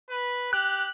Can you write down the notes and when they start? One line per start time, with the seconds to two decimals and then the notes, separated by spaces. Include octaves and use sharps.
0.10 B4
0.53 G4 F#6